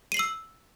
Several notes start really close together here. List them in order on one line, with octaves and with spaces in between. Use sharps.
D#7 C7 F#7 E6